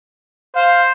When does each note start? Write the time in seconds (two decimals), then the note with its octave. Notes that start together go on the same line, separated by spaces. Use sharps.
0.56 C5 F5